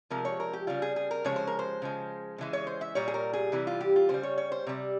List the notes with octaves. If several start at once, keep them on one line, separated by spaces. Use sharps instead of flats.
C3 F3 G#3 A#4
C#5
A#4
G4
C#3 G3 F4
G#4
G#4
A#4
C#3 F3 G#3 C#5
C5
A#4
C5
C#3 F3 G#3
C#3 E3 G#3
C#5
C5
E5
A#2 G3 C#5
G#4
A#4
G#4
C3 E3 G3
F4
G4
F4
C#3 G3 C5
C#5
C#5
C5
C3 G3